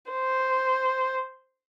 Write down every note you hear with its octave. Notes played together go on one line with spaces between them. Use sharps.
C5